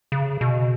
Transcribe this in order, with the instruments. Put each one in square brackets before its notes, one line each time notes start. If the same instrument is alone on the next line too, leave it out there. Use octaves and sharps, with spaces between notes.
[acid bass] C#3
B2